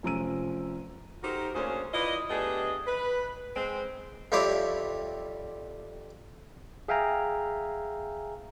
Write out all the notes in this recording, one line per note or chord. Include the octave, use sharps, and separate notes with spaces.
F1 F3 C#4 A#5 E6 D#7
D#4 F#4 G4 A4 A#4 C5
D2 A#3 C#4 D4 G#4 C5
E4 F4 B4 D5 D#5
A3 B3 D4 G4 G#4 D#5
B4
G#3 C4
F2 G3 C4 E4 C#5 D6
G#4 E5 F5 G5 G#5 A#5